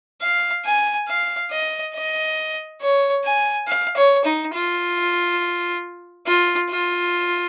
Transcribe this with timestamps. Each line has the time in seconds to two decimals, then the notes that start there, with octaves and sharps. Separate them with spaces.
0.22 F5
0.65 G#5
1.08 F5
1.51 D#5
1.94 D#5
2.81 C#5
3.24 G#5
3.67 F5
3.96 C#5
4.24 D#4
4.54 F4
6.27 F4
6.70 F4